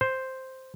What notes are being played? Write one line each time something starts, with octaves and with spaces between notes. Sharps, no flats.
C5